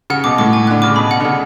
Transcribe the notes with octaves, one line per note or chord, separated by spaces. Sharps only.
C#3 F#5
B2 D6
A2 D6
G#5
D3 F#6
C#3 D6
B2 B5
F#5
D3
C#3 F#5